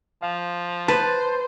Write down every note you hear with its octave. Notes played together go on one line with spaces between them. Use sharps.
F3 F5
B4 C5 A5 A6